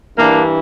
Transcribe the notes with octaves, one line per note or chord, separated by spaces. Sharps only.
G2 E3 A#3 D4